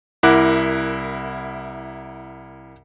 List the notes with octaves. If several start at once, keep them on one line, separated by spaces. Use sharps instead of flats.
C2 E4 A#4 F#5 D6 F#6